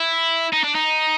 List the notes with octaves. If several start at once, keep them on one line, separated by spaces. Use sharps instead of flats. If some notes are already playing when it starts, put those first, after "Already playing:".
Already playing: E4
D#4
D4
D#4